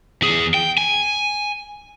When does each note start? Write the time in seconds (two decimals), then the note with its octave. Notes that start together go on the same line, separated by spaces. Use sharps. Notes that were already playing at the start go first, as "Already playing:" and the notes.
0.22 E2 G#4
0.54 G5
0.78 G#5